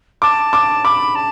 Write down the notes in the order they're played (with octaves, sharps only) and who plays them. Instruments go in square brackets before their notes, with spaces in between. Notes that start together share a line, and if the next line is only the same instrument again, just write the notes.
[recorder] A5 [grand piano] D6
[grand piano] D6
[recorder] B5 [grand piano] D6
[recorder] A5